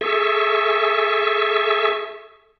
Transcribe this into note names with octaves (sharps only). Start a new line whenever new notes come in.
G#4 A4 E5 C#6